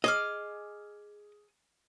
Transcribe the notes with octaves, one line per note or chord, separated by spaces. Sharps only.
G#4 D#5 D6 F6